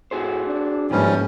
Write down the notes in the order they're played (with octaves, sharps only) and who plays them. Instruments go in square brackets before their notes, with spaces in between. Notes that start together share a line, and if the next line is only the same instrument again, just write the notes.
[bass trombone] A2 [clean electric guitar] F#4 G#4 C5
[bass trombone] D4
[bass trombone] F#1 [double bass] G#2 A#3 [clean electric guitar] D#3 B4 [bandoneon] F3 G3 C#4